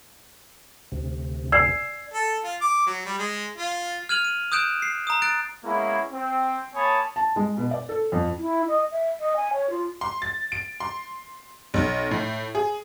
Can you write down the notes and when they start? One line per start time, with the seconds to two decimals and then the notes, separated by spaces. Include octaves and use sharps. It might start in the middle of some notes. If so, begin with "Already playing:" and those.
0.92 D2 C3
1.52 D5 G#5 E6 G#6 C7
2.13 A4
2.44 F4
2.61 D6
2.87 F#3
3.06 G3
3.19 G#3
3.58 F4
4.09 F6 G#6 D#7 F7 F#7
4.25 D#7
4.52 D#6 F#6 G6 D7 E7
4.82 C7
5.07 A#5 D#6
5.22 F#6 A6 D7
5.64 G#3 A#3 B3 C#4 E4
6.12 C4
6.75 A#3 C#5 G#5 A5 B5 D#6
7.16 A5
7.36 G#3
7.57 B2
7.71 D5
7.89 A4
8.12 F2
8.37 E4
8.68 D#5
8.92 E5
9.20 D#5
9.36 G#5
9.53 C#5
9.70 F4
10.01 C6
10.22 A6
10.52 D7
10.80 C6
11.74 B1
12.11 A2
12.55 G#4